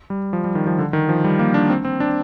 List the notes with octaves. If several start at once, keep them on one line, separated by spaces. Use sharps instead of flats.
G3
F3
G3
D#3
F3
D3
D#3
F3
G3
A#3
D4
C4
C4
D4